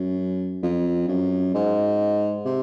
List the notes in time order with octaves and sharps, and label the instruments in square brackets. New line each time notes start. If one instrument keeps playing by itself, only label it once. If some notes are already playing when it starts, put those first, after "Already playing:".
Already playing: [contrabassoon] F#2
F2
F#2
G#2
C3